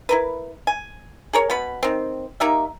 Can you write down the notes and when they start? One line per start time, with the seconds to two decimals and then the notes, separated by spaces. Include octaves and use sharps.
0.09 E4 A#4 B4
0.67 G#5
1.33 G#4 A#4 C#5
1.50 B2 B3 B5
1.83 D#3 C4
2.40 A#3 D#4 G4 E5